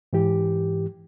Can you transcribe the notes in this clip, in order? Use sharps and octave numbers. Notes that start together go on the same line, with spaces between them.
G#2 E3 G4